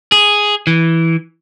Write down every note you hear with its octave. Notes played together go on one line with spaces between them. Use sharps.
G#4
E3